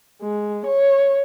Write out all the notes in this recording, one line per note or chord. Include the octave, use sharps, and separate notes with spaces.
G#3
C#5